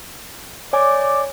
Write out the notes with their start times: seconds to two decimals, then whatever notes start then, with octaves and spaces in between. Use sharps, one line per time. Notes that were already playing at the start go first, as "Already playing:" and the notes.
0.73 C#5 D5 G#5 D6